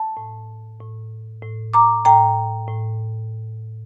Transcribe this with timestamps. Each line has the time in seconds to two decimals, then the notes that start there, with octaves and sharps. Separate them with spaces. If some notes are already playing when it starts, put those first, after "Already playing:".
Already playing: A5
0.17 A2
0.80 A2
1.42 A2
1.74 A#5 D6
2.05 A2 G5 A#5
2.68 A2